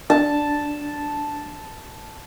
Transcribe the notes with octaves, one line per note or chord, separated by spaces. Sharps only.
D4 A5